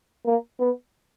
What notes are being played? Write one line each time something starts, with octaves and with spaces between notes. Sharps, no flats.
A#3
B3